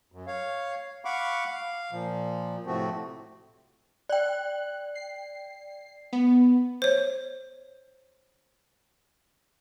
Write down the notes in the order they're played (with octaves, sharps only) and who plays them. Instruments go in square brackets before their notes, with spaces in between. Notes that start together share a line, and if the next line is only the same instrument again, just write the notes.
[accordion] F#2
C#5 F5
F5 F#5 B5 C#6 D6
F5
A#2 F3
A2 C3 F3 A3 C4 F#4
[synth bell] D5 G5 [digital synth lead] F#6
[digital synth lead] C7
B3
[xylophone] C5 C#5